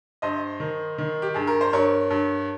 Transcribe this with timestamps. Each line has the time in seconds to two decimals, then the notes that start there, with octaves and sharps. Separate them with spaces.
0.22 G2 C5 D#5
0.60 D#3
0.98 D#3
1.22 G4
1.34 G2 G#4
1.47 A#4
1.61 C5
1.73 G2 A#4 C#5
2.10 G2